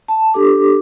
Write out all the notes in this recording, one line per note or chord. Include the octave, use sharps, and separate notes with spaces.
A5
D4 G4 A4 D6